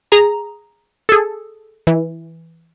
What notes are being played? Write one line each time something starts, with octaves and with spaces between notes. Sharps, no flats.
G#4 A#5
G#4 A4
E3